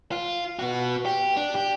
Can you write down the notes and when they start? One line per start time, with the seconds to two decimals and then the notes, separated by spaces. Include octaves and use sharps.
0.11 F4
0.59 B3 F#4
1.06 G4
1.37 D4
1.55 G4